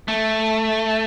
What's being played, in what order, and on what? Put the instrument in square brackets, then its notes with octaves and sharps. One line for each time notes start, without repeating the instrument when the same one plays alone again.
[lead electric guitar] A3